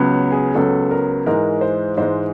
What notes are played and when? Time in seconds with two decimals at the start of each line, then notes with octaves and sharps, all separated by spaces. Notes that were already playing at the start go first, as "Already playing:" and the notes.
Already playing: C#2 C#3 F#3 B3
0.32 G#4
0.55 C#2 C#3 F#3 B3 A4
0.91 A#4
1.26 G#2 E3 G#3 A#4
1.61 C5
1.97 G#2 E3 G#3 C5